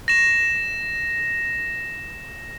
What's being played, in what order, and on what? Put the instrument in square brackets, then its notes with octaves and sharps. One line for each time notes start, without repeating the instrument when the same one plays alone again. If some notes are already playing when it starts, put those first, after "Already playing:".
[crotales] A#6 E7